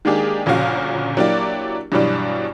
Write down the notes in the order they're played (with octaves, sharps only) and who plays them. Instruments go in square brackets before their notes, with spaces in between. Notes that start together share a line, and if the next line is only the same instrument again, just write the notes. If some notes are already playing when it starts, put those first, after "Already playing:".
[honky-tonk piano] D#3 G#3 A#3 D4 G4 G#4
G1 A#2 C#3 F3 F#4 F5
F#3 A#3 D4 E4 G4 D5
G2 B2 E3 F#3 G3 D4